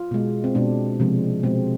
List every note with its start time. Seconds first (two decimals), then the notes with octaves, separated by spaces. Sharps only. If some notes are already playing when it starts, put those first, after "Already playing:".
Already playing: F4
0.11 B2 G#3
0.44 C4
0.55 B2 G#3 D4
1.00 C3 F3 G#3
1.43 B2 G#3 C4